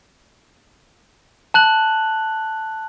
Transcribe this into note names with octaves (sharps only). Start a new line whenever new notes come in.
A5 F#6 F#7